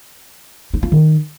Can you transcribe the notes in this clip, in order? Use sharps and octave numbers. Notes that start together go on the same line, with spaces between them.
D#4
F4
D#3